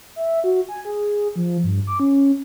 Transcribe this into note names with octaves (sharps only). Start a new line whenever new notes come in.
E5
F#4
G#5
G#4
F3
G2
D6
C#4